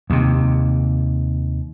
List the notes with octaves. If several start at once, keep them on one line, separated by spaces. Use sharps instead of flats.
D#2 C3